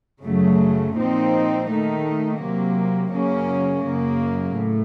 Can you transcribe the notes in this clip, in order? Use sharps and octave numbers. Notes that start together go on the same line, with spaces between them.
F#2 C#3 F#3 A3
A#2 F3 C4 D#4
D#3 A3 D#4
C3 F#3 A#3
F#2 C#3 F#3 A#3 C#4
F#2 C#3 F#3 A#3
A2